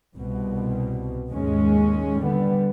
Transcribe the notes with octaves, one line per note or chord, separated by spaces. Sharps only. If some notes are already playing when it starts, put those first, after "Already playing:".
C2 B2
D#2 G#2 G#3 C#4
D3 G3 B3